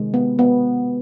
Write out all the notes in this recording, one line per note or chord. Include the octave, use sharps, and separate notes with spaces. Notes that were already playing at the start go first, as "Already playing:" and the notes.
Already playing: C3 D#3 G#3
B3
B3